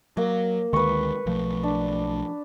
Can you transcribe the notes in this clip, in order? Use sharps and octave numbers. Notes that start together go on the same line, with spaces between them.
F#3 A#3
D2 D#3 G#3 B4 C#6
B1 F3 A3
D4